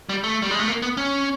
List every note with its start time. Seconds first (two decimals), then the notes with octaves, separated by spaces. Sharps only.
0.09 G3
0.24 A3
0.42 G3
0.51 G#3
0.59 A3
0.68 A#3
0.82 B3
0.97 C#4